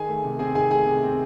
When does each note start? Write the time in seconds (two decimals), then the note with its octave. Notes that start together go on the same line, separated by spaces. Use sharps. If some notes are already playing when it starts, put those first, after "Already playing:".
Already playing: D#3 G#4 G#5
0.09 A3
0.24 C3
0.39 C4 G#4 G#5
0.55 D#3 G#4 G#5
0.71 A3 G#4 G#5
0.86 C3
1.03 C4